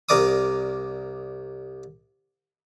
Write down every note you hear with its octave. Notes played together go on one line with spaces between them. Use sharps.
C2 A#4 D5 D6 D#6